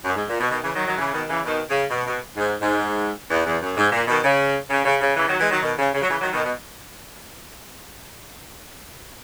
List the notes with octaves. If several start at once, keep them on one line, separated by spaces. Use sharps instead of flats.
F#2
G#2
A#2
B2
B2 D#3
C#3 E3
D#3 F#3
D#3 F#3
C#3 E3
B2 D#3
C#3 E3
B2 D#3
C#3
B2
B2
G#2
G#2
E2
E2
F#2
G#2
A#2
B2 D#3
C#3
C#3
C#3
C#3
C#3 E3
D#3 F#3
E3 G#3
D#3 F#3
B2 D#3
C#3
C#3
F#3
C#3 E3
D#3 F#3
B2 D#3
B2